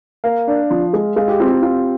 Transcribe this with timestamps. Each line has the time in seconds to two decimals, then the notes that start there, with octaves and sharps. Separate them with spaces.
0.24 A#3 F5
0.48 D4
0.70 F3
0.93 G#3
1.16 G#3 F5
1.28 G4
1.40 C4 F4
1.51 G4
1.62 C4 F4